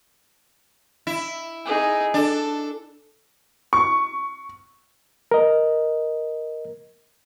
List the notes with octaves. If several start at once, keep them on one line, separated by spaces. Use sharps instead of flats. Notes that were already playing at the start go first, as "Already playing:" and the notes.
E4
D#4 G#4
D4 A4
C#6
A#4 D#5